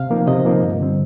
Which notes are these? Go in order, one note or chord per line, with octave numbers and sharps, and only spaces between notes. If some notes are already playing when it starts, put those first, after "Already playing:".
Already playing: C3 F5
F3 A#3 D#4
C3 D#5
F3 A#3 D#4
G2
D3 G3 C4